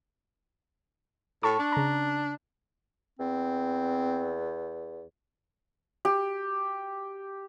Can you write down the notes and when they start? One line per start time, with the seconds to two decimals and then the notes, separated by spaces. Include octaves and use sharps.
1.43 A2 A5 C#6
1.59 D4
1.72 C#3 A#5
3.19 E2 C4
6.05 G4